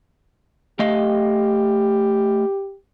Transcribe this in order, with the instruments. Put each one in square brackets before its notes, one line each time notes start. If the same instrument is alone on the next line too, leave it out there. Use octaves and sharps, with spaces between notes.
[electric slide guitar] A3 D#5 F5 [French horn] G4